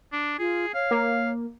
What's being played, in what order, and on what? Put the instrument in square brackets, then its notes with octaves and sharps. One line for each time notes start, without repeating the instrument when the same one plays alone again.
[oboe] D4
[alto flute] F4 [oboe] G#4
[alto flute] C#5 [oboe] F5
[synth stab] A#3